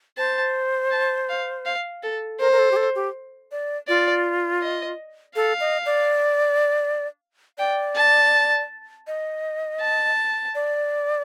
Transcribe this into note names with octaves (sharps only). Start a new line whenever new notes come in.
C5 A5
A5
F5
F5
A4
A#4 C5
A#4
A4
G4
A4
G4
D5
F4 D5
D#5
A4 F5
D#5
D5
D5 G5
A5
D#5
A5
D5